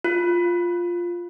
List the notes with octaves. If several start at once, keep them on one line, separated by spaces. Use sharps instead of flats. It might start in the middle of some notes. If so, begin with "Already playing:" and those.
F4